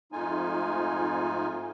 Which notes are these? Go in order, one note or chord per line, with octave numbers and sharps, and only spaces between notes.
F2 G#2 A3 D#4 F4 G#5